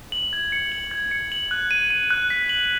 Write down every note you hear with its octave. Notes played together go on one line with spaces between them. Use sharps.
F#7
G#6
C#7
F#7
G#6
C#7
F#7
F#6
D#7
D#7
F#6
B6
F#7